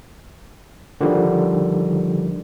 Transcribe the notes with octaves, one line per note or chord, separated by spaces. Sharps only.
D3 D#3 F3 G3